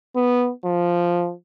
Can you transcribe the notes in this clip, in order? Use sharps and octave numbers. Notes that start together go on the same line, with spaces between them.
B3
F3